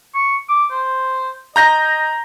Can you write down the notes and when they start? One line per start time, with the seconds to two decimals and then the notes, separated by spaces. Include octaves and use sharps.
0.15 C#6
0.49 D6
0.71 C5
1.56 D#5 A#5 G6 A#6